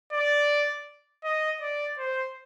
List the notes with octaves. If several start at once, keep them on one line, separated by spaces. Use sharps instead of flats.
D5
D#5
D5
C5